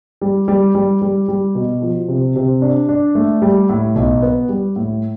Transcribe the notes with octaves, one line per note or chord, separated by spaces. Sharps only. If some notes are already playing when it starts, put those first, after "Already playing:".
G3
G3
G3
G3
G3
B2
F3
C3
C3
D4
D4
A3
G3
A2
B1
B3
G3
A2